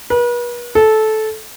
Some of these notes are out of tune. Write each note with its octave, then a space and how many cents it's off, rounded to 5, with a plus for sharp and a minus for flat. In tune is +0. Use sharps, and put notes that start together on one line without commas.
B4 -40
A4 -15